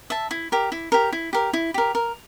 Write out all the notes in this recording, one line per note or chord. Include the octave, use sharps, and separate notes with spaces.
E5 A5
E4
G4 A#4
E4
G4 A#4
E4
G4 A#4
E4
G4 A#4
A#4